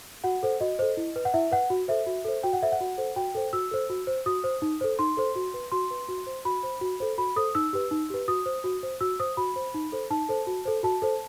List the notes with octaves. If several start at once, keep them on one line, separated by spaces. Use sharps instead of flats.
F#4 F#5
A4 C5
F#4 D#5
A4 C5
E4
B4
F#5
E4 E5
B4 F#5
F#4
A4 C5 E5
F#4
A4 C5
F#4 G5
F#5
A4 C5 E5
F#5
F#4
A4 C5
F#4 G5
A4 C5
F#4 E6
A4 C5
F#4
C5
F#4 D#6
C5
D#4
A4 C5
D#4 C6
A4 C5
F#4
B4
F#4 C6
B4
F#4
C5
F#4 B5
C5
F#4
A4 C5
F#4 B5
A4 C5 D#6
D#4 E6
G4 B4
D#4
G4 B4
F#4 D#6
C5
F#4
C5
F#4 E6
C5 D#6
F#4 B5
C5
D#4
A4 C5
D#4 A5
A4 C5
F#4
A4 C5
F#4 A5
A4 C5